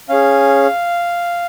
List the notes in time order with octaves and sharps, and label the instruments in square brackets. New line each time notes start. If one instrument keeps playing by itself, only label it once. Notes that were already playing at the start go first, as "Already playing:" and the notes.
[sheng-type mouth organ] C#4 G#4 F5